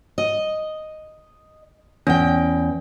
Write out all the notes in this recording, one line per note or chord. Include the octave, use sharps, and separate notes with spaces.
D#5
E2 C#4 G5